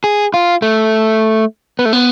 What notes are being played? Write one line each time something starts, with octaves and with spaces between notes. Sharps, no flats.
G#4
F4
A3
B3
A3
B3